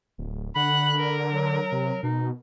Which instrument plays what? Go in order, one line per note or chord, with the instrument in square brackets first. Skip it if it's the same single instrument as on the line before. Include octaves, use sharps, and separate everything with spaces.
[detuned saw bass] D1
[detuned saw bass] D3 [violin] F#5 F#6 [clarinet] B5
[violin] A#4
[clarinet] F#3
[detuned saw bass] C3
[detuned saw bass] B2 [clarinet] D#4